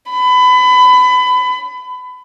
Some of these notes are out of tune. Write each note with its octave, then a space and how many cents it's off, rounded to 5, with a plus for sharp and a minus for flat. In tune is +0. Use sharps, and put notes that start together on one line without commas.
B5 +25